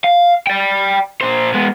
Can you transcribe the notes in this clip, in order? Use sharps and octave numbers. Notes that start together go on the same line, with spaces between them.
F5
D5 G5
A#2 C5
G#3 B3